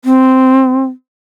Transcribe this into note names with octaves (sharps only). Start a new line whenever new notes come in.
C4